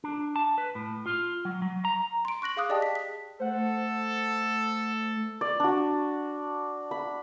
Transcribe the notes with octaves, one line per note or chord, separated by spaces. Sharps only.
D4
A5
B4
A2
F4
F#3
F#3
A#5
C6 D7
C#6 F#6 A#6 F#7
G#4 F5 D6 D#6 F#6
G4 G#4 D5 D#5 G5 A5
B6
B6
A3 A4 C5 F#5
D5
D4 F#4
B5